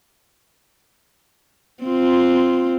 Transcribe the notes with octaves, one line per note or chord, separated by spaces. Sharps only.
C4 F4